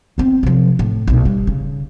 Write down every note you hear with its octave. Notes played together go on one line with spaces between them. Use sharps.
B3 C4
C3 F3
A2
B1 A#2
G3
C#3